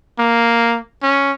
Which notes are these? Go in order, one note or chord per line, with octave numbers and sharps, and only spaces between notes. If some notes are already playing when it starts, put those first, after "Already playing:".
A#3
C#4